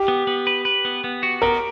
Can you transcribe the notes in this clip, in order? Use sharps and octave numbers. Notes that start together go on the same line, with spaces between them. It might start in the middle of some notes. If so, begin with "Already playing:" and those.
Already playing: G4
B3
B3
B4
B4
B3
B3
F#4
B3 A#4